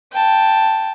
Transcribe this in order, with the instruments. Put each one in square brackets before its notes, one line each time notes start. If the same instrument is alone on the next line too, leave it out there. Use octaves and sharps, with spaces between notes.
[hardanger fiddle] G5 A5